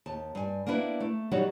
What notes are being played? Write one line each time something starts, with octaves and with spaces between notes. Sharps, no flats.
D#2 A5
G2 G#5
A#3 B3 D4 E4 B4
A3
D#3 F#3 G3 D#4 F#4 C#5